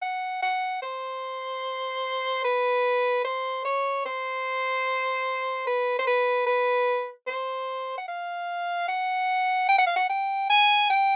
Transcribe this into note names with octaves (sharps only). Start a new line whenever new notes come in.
F#5
F#5
C5
B4
C5
C#5
C5
B4
C5
B4
B4
C5
F#5
F5
F#5
G5
F#5
F5
F#5
G5
G#5
G5